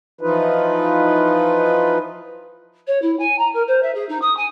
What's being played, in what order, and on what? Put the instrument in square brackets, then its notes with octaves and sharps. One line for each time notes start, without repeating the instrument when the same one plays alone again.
[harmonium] E3 F3 D#4 F4 B4
[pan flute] C#5
E4
G#5
A#5
A#4
C5
E5
G#4
D#4
D#6
G#5